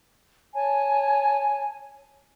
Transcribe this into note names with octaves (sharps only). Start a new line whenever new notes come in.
C#5 G#5 A5